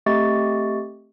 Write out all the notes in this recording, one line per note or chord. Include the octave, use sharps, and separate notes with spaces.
A3 C4 G4 D#5 C#6 A6